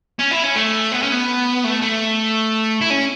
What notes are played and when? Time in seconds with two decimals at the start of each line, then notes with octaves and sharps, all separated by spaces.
0.19 C#4
0.31 E4
0.44 C#4
0.56 A3
0.92 B3
1.02 C#4
1.12 B3
1.65 A3
1.82 A3
2.81 E4
2.90 C#4